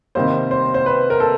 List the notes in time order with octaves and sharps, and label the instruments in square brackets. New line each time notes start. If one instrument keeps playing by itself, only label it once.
[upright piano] C3 D#3 G3 A#3 C5
C5
C5
B4
A#4
A4